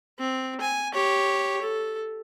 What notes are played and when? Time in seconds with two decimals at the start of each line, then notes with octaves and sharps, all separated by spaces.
0.19 C4
0.61 G#5
0.94 G4 C#5
1.62 A4